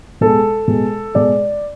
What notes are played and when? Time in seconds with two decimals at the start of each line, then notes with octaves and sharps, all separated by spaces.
0.21 B2 G#3 A4
0.68 B2 G#3
1.15 B2 G#3 D5